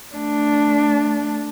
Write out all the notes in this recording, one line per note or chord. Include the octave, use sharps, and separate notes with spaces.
A3 D4